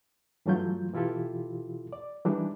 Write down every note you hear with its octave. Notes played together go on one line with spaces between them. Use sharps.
G2 E3 F#3 A3 F4 G6
B2 E3 E4 F4 G4 A4
D5
E3 G3 G#3 D4 D#4